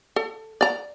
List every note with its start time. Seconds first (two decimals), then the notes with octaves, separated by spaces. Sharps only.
0.16 A4
0.61 D5 A#5